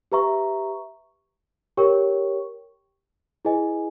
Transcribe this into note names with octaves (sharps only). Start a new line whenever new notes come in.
G4 B4 E5 A#5 C#6
G4 A#4 C#5 G5 C#6
E4 G#4 B4 D#5 G#5